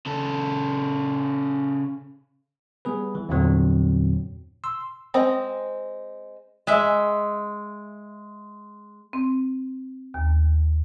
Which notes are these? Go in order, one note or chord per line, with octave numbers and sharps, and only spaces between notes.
C#3 A4
G3 B3 G#4 B4
E3
E2 G2 A#2 D3 F#3 C4
C6 E6
G#3 C4 D#5
G#3 E5
C4
D#2